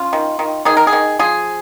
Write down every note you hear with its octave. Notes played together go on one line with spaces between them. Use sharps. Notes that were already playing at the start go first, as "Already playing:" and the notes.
Already playing: C#4 F4
D#3
D#3
D#3 G#4
A#4
G#4
D#3
F3 G#4